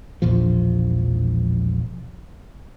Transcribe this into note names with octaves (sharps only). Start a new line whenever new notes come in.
E1 A#1 F3